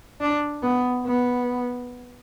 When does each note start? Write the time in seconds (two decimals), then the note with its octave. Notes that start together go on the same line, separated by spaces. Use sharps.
0.21 D4
0.63 B3
1.06 B3